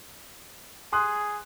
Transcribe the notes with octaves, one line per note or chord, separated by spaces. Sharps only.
G#4 C6 D#6 F#6